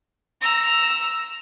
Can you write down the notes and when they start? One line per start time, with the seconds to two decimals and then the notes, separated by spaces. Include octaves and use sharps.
0.41 A#5 E6